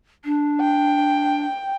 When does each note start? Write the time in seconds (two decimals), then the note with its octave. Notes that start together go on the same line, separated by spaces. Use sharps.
0.25 D4
0.61 G5